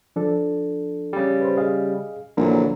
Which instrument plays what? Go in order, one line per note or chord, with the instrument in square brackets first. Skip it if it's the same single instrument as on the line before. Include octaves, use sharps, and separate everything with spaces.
[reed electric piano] F3 D4 A4
[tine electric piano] C#3 G3
[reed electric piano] B4 C5
G#4 D#5 F5
[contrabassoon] A#1 [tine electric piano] D3 E3 F#3 [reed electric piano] A#4